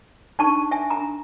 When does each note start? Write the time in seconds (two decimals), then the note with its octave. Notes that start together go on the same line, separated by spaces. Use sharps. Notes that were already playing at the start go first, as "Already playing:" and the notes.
0.39 D4 D#4 A5 C#6
0.71 E5 G#5
0.90 A#5